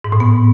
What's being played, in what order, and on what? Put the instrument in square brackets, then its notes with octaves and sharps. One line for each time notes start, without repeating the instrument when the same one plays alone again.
[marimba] G#2
A2
B3